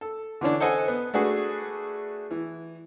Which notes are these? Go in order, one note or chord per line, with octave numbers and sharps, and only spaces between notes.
A4
D3 E3 C#4 D4
A4 C5 D#5 F#5 G#5
B3
A3 D4 F#4 G#4 B4
E3